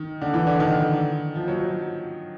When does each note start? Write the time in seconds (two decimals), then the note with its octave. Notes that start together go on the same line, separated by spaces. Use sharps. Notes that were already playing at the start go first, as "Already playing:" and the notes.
Already playing: D#3
0.21 D3
0.34 E3
0.47 D3
0.60 D#3
1.35 F3
1.48 F#3